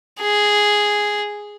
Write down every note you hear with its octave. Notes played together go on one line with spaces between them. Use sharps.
G#4